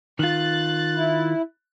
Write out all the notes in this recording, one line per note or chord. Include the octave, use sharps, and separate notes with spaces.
D#3 F4 F#6 A6
E4